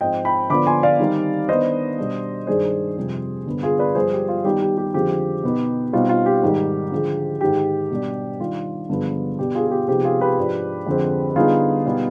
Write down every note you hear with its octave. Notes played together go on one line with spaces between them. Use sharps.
G#2 F3 C4 D#5 G5
G5 B5
D3 F3 B3 D4 B5 D6
G#5 C6
D5 F5
D#3 G3 C4 D#4
D#3 B3 D4 C5 D#5
B2 G3 D4
G2 D#3 G#3 D4 G#4 C5
F2 C3 G3
G2 D3 G#3 B3
F4 G#4
B4 D5
G2 F3 G#3 G#4 C5
G4
F4
D#3 G3 B3 D#4 G4
G4
G4
F2 D3 F3 G#3 C4 G4
B2 B3 D#4
B2 G3 C4 D#4 F4
F4
G4
G#2 D#3 G3
D3 F3 G#3
G#2 D#3 G#3 G4
B2 G3 D4
D#3 G3 D4 F4
G2 D3 F3 G#3 B3
B2 B3 D4 G4
F4 G#4
G#4
G4
C3 F3 G#3 B3 D#4 G4
F4 G#4
G4 B4
G#2 F3 G#3 D4
F2 D3 G#3 C4
D3 G3 B3 D#4 F4 G#4
B2 G3 B3 D#4